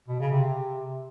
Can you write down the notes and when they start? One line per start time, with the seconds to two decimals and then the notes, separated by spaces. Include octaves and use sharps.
0.08 B2
0.20 C#3
0.32 C3